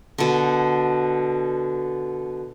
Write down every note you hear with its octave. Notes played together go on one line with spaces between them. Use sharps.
B2 D3